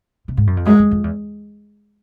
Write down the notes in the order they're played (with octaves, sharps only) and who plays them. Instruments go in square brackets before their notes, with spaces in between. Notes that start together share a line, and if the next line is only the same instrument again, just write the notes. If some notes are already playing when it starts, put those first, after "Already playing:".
[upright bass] C3
G#2
F#2
F2
[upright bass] F#2 [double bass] G#3
[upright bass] F2
F2
E2